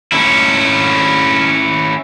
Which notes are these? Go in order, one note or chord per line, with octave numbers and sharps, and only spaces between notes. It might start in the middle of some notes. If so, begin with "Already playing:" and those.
C#4 E4